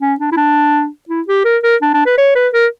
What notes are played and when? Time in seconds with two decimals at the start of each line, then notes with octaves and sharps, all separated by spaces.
0.01 C#4
0.20 D4
0.32 E4
0.37 D4
1.09 E4
1.28 G4
1.45 A#4
1.63 A#4
1.82 D4
1.94 D4
2.06 B4
2.18 C#5
2.35 B4
2.54 A#4